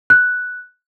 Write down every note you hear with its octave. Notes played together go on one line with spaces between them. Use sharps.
F#6